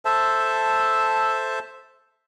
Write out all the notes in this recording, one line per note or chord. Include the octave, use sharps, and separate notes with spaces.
A4 C5 E5 A5